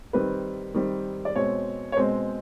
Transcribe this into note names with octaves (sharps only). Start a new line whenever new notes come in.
D#3 G3 C4 B4
D#3 G3 C4
D5
B2 G#3 C4 C#5
C#5
B2 G#3 C4 C5